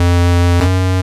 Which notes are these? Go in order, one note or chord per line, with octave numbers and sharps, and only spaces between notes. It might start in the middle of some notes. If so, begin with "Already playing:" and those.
Already playing: F2
F#2